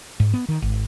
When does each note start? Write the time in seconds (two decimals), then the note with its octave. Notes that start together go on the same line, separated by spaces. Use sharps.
0.20 G#2
0.34 B3
0.49 D#3
0.62 G#1